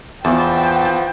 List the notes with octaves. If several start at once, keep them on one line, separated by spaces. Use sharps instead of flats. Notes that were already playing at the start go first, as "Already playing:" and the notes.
E2 E3 F3 F#4 G5 A5